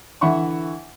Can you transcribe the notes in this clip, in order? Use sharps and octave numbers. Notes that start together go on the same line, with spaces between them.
D3 E3 E5 F#5 B5 C#6